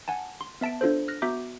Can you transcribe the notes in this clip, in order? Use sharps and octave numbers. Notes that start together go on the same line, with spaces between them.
F#5 G#5 A5
C6
B3 E5 A5 B6 D7
D4 F4 A4 C5
F6 F#6 A#6
B3 F#4 E5 A#5 D6 G6